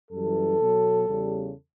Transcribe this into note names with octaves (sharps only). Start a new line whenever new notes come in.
F#2 E3 G3 A4
B2 F#3
E2 C#3 G3